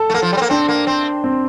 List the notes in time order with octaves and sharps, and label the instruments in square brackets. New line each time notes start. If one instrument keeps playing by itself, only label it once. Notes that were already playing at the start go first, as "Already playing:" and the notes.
Already playing: [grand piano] A4
[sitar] A3
A#3
F3
G3
C4
A#3
[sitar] C4 [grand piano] D4
[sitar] A#3
C4
[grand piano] C4